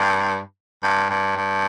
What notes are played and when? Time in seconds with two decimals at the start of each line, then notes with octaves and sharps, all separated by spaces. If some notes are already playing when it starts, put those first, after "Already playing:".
Already playing: G2
0.83 G2
1.10 G2
1.37 G2